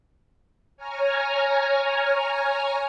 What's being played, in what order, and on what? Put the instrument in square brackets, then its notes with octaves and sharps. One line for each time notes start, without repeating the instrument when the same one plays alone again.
[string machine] C#5 G#5 A#5 F6